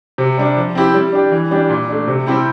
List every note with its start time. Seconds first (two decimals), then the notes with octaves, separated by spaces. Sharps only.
0.18 C3
0.38 G3 D4
0.57 F3
0.75 C4 E4 G4
0.94 G3
1.12 D4 G4
1.31 E3
1.51 G3 D4 G4
1.70 A#2
1.89 A3 D4
2.07 C3
2.27 G3 C4 E4 G4